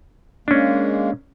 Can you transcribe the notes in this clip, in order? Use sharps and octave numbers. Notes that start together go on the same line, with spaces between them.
G#3 A#3 C#4 D4